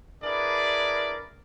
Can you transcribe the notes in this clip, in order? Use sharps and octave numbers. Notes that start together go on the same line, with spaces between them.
D4 E4 G#4 A#4 B4 D5